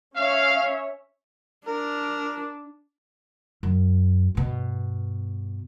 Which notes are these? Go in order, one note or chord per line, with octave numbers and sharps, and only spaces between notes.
C#4 C#5 E5 F5
D4 A#4
F#2
G2 B2